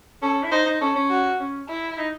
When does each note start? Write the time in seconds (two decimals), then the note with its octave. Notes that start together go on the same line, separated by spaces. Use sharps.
0.22 C#4 A4
0.43 E4
0.51 D#4 C5
0.66 D#4
0.81 C#4 A4
0.96 C#4
1.10 F#4
1.40 C#4
1.69 E4
1.98 D#4